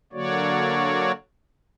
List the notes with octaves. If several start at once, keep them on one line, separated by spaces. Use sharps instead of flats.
D3 F#3 A#3 F#4 C#5 D5